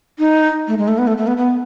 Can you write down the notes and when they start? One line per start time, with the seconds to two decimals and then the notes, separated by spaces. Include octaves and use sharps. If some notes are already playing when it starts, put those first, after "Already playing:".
0.19 D#4
0.68 A3
0.78 G#3
0.88 A3
0.98 B3
1.07 A3
1.18 A3
1.27 B3
1.37 B3